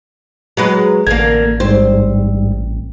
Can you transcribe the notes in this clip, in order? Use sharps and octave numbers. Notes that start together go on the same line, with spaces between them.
F#3 G#3 B4
A1 D3 A#3 G#6
G#2 G3 C4